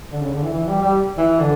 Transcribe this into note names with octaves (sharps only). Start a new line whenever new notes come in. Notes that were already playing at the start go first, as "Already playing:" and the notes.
D3
C#3
D3
E3
E3
G3
G3
E3
D3